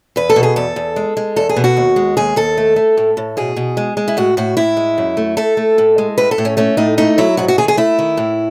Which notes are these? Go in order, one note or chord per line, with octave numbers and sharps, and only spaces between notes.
E2 B4
A4
B2
G#4
E2 A4
E2
G#3
G#3
E2 A4
G#4
B2
F#4
D#2
G#3
D#2 G#4
D#2 A4
A3
A3
A2
A2
B2 G#4
B2
G#3
G#3
E4
A2 F#4
A2 F#4
A2 E4
G#3
F#2
A3
A3 A4
A3
A2
G#3
A2 B4
A4
A2
C#4
A3 C#4
A2 D#4
A3 D#4
F#3 E4
G#2 F#4
F#4
D#3 G#4
G#4
A3 E4
D#3
A2